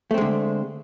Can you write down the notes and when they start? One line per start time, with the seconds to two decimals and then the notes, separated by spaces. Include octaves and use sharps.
0.11 A3
0.14 C4
0.18 G#3
0.21 D3